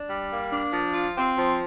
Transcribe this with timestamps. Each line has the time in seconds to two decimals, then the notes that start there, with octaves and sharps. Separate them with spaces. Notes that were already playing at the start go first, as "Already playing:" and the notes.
Already playing: D4
0.09 G3
0.30 A#3
0.52 D4
0.73 F3
0.94 F4
1.15 C4
1.37 F3